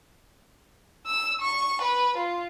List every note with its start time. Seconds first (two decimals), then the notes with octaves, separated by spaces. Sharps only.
1.07 E6
1.41 C#6
1.82 B4
2.17 F4